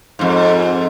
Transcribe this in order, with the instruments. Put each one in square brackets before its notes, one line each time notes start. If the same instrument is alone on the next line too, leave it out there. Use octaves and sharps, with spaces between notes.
[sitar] F2 G#2